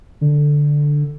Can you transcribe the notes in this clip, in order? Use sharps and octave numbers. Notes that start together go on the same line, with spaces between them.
D3